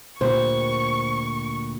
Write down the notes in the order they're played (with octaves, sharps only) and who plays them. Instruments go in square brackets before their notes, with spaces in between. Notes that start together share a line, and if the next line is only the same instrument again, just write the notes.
[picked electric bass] D2 A#2 G3 [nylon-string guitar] C5 [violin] C#6